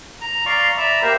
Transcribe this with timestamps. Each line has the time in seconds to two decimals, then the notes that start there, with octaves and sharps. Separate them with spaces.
0.21 A#5
0.46 D5 F5 A#5 C6 C#6
0.77 D5 E5 A#5 B5
1.02 A#3 G4 A#4 C5 E5